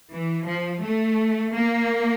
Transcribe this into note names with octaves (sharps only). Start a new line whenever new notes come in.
E3
F3
A3
A#3